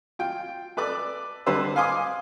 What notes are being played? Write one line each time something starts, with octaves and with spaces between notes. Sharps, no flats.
F4 G5
A4 B4 D5 D6
D3 G3 B4 C5 E6
F5 G#5 C6 D6 D#6